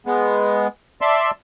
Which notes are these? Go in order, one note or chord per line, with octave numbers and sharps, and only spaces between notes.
G#3 B3
D5 E5 A5 C6